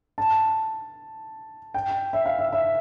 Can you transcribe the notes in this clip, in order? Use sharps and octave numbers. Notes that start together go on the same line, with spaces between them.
A5
G5
E5
F5
E5
E5